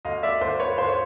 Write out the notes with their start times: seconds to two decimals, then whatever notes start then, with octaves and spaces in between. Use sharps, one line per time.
0.05 D2 D#5 F5
0.23 D5 E5
0.41 D2 C5 D5
0.60 B4 C#5
0.78 D2 C5
0.89 C#5